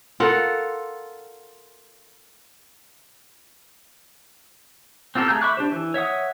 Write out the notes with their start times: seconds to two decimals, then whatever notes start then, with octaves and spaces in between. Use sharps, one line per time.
0.20 F4 A4 A#4 F#5
5.15 C4 F4 G4 A4 A#4
5.28 A3 G#4 A#5 G6
5.41 E5 B5 C#6 D6 F#6
5.57 D4 G4 C5
5.72 E3
5.94 C#5 E5 F#5 D#6